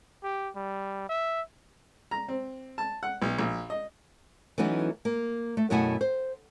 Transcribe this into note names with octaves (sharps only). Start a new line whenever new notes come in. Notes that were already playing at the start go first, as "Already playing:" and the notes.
G4
G3
E5
A#5
C4
A5
F#5
B1
A#1
D#5
E3 F#3 A3 B3 C#4 D#4
A#3
A3
F#2 B2 A3 E4 F#5 G#5
C5